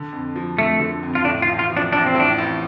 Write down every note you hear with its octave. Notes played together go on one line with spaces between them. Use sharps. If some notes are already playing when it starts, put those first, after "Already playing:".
Already playing: D3
F2
F3
F2 A3
D3
F2
F4
A2 D4
F4
A1
F4
F3
D4
A1 D4
C4
A2 D4
A1